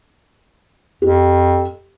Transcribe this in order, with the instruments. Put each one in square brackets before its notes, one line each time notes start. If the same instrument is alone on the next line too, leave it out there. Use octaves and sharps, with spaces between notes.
[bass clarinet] F2 [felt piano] G4